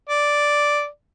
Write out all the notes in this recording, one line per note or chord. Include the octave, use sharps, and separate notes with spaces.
D5